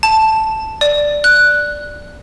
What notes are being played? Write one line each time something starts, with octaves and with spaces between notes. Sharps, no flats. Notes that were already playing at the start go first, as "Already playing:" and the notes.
A5
D5
F#6